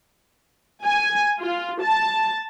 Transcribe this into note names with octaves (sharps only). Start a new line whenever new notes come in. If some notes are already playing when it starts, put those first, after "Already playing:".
G#5
F4
A5